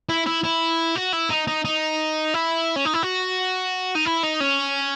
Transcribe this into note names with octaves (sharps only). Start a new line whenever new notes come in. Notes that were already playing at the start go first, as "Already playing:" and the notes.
E4
E4
E4
F#4
E4
D#4
D#4
D#4
E4
C#4
D#4
E4
F#4
D#4
E4
D#4
C#4